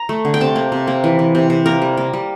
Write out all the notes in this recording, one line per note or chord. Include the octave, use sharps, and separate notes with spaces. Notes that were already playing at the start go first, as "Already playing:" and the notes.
Already playing: A#5
A3
D3
G5
C3 A5
A#3
C3
A#3
E3
E3
C3
C3
A#3 A#4
G3
A#3
G3